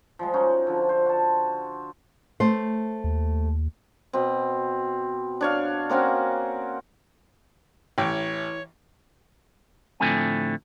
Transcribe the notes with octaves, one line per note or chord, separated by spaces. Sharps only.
F3 G3 G#3
C#4 D#4 F#4
D3 F3
C5
F#4 A5
A3 C5
D#2
B2 C4
D4 C#5 F5
A#3 C4 C#4 F#4
A1 E3 C#5 G5
A2 D3 F3 A3 C4 G#5